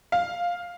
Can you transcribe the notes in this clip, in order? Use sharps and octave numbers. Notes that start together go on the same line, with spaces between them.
F5